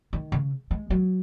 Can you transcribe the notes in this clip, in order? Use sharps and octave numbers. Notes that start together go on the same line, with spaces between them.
D#3
C#3
G#3
F#3